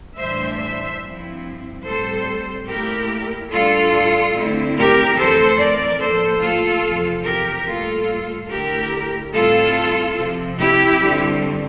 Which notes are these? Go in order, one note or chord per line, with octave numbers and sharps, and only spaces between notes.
A2 E3 G3 D4 C5 E5
C5 E5
G2 F3 C4 E4
A2 G3 C4 A4 C5
A#2 A3 E4 G4 A#4
A2 G3 D4 F4 A4
D3 A3 C4 E4
G4 A#4
F2 E3 A3 C4 A4 C5
A#4 D5
A2 F3 A#3 A4 C5
F4 A4
E2 C3 F3 C4
G4 A#4
A2 G3 A#3 F4 A4
D3 A3 E4 G4 A#4
A2 G3 C4 E4 F4 A4
C3 F3 C4
E4 G4
G2 D3 G3 C4